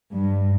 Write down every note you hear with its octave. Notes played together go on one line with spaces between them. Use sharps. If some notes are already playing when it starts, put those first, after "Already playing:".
G2